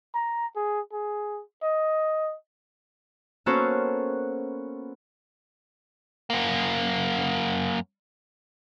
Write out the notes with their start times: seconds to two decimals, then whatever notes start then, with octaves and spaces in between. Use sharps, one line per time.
0.14 A#5
0.56 G#4
0.92 G#4
1.63 D#5
3.46 A#3 B3 C#4 F#4 A4 C5
6.30 F#2 A#3